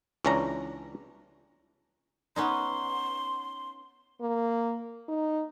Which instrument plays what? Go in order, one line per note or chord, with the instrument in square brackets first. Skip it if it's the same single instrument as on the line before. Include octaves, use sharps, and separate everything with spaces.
[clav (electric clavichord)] C#2 E3 C#4 D4 A#5
[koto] B3 C#4 D#4 [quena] C6
[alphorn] A#3
D#4